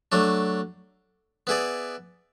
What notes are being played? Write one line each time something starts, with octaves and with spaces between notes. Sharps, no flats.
F#3 A3 D4
B3 E4 G#4 D5